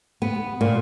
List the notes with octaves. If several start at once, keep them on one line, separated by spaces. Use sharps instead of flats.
B3
A#2